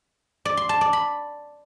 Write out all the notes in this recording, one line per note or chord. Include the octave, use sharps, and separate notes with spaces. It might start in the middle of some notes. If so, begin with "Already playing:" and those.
D5
C6
A5
D5
B5